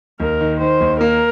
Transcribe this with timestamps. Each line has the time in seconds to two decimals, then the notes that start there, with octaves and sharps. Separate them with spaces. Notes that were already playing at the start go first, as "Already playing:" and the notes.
0.20 D#2 A#4
0.41 D#3
0.60 D#3 C5
0.81 D#2
1.01 A#3 A#4